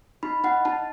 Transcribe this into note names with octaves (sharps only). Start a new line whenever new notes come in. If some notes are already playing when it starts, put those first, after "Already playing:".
D#4 B5
D#4 F#5
D#4 A5